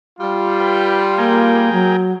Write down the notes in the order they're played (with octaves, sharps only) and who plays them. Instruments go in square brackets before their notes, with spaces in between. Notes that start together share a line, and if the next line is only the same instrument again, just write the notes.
[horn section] G3 F4
[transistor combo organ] B4 G5
[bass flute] A#3 [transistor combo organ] G#4 A#4 G5
[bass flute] F#3